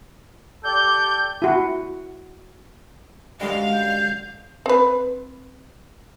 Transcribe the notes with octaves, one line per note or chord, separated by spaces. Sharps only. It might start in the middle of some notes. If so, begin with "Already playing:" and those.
G4 A4 D5 G6
E4 F#4
F#2 D3 G3 G#3 F5
G6
C4 B4